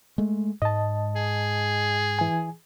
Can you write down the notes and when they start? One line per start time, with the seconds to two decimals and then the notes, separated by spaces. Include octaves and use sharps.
0.18 G#3 A3
0.62 G#2 D#5 A5
1.16 G#4
2.19 E3 G#5